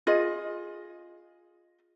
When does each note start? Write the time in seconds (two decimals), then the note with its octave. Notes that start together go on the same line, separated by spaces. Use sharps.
0.07 F4 G#4 D#5